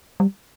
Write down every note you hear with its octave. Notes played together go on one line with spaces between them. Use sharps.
G3